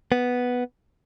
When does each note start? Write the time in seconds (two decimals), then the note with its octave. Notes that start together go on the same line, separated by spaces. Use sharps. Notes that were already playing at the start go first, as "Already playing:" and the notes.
0.12 B3